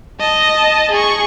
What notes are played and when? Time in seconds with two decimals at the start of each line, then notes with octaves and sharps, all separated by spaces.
0.20 D#5 A5
0.91 G#4 C#6